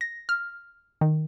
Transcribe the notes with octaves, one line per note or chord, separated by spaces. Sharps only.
A#6
F6
D#3